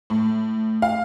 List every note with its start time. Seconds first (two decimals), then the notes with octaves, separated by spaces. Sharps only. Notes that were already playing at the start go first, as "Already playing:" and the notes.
0.10 A2
0.82 F5